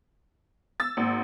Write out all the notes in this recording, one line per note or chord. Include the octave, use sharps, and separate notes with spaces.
E6 A6
G#1 A#3